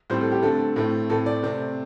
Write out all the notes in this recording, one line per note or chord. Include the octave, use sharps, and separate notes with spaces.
A2 G3 C4 C5
A4
G4
D3 A3 C4 A4
A2 A3 C4
A2 A3 C4 A4
D5
C3 A3 C4